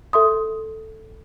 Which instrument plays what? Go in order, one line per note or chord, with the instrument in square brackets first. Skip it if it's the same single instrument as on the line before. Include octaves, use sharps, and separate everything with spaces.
[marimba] A4 E5 C6 D#6